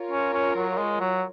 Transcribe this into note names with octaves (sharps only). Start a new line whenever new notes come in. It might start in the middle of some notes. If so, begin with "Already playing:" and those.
Already playing: F4 A#4 C#5
C#4
C#4
F#3
G#3
F#3